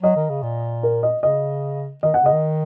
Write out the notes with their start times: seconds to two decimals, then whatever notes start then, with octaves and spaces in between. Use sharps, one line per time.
0.03 F#3 D#5
0.16 D#3
0.30 C#3
0.43 A#2
0.83 A#4
1.03 D#5
1.23 C#3 D#5
2.03 D#3 D#5
2.14 F#5
2.23 C#3 D#5
2.33 D#3